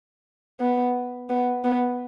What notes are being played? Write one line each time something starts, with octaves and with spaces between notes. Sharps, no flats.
B3
B3
B3